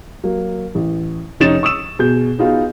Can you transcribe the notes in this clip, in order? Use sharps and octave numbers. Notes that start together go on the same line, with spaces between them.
F#3 A#3
A1
F1 C#4 D#4 C#5 A6 E7
C#6 D#6 E6 E7
B2 G#4 G6
B3 D#4 F4 F#4 G#4